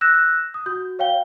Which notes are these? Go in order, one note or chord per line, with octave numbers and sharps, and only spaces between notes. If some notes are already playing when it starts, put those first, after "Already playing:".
E6 F#6 G6 A#6 E7
D#6
F#4 G6
C#5 F5 G5 G7